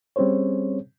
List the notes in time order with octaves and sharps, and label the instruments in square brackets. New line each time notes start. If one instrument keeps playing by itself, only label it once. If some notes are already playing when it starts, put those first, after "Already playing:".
[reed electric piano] G3 C4 C#4 G#4 C5 C#5